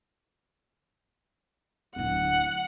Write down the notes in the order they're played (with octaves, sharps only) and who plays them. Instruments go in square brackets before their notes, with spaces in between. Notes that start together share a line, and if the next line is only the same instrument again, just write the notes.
[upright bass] D1 D4 [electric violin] F#5